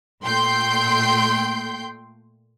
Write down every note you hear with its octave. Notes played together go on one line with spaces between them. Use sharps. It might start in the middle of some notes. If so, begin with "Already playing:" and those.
A#2 A3 G5 C6 G6